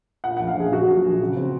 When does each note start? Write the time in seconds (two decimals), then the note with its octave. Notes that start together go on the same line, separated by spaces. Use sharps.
0.24 A#2 F#5
0.37 A#1 F#5
0.48 F5
0.56 A#1 G#4
0.72 F#3 F#4
0.89 A#2
1.04 A#1
1.21 C#3
1.37 C4